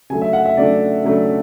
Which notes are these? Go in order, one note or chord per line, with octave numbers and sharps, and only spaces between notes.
C#3 F#3 A3 D4 G#5
E5
F#5
E5
C#3 F#3 A3 D4 D5
C#3 F#3 A3 D4